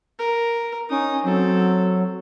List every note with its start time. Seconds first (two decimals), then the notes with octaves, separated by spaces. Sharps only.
0.19 A#4
0.90 C#4 D#4 D#6
1.24 F#3 C4 A4